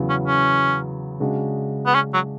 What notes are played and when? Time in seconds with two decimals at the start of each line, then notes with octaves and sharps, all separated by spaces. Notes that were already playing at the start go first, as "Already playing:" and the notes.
Already playing: E2 C#3 F#3 B3
0.09 C#4
0.27 C#4
1.20 C#3 G#3 D4 F#4
1.86 B3
1.94 C#4
2.14 F#3